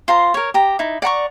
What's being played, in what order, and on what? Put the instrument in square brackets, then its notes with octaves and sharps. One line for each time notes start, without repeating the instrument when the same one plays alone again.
[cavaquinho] F4 C5 A#5 C6
A#4 C#5
G4 A#5
D#4 E4
D5 F#5 A#5 C#6